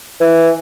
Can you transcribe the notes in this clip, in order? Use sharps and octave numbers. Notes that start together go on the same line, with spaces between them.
E3